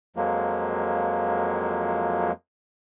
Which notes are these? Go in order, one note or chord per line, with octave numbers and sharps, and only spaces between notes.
F2 F3 F#3 G#3 A#3